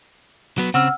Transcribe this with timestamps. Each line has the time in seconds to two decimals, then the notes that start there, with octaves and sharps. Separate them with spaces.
0.58 F#3 B3
0.74 C#3 C4 F#5 E6 F6